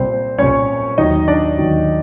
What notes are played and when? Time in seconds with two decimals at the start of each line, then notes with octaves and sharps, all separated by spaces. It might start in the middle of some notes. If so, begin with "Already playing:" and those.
Already playing: C2 A#2 G3 C4 C5
0.38 C2 A#2 G3 C#4 C#5
0.98 D#2 D#3 F#3 D#4 D#5
1.28 D4 D5
1.58 D#2 D#3 F#3